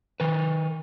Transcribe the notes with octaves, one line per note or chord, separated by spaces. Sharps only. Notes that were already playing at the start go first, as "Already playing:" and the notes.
D#3 B4